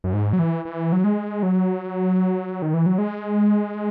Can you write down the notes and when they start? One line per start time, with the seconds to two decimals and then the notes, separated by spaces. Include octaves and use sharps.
0.04 F#2
0.13 G#2
0.33 F#3
0.39 E3
0.65 E3
0.92 F#3
1.04 G#3
1.43 F#3
2.62 D#3
2.74 E3
2.86 F#3
2.98 G#3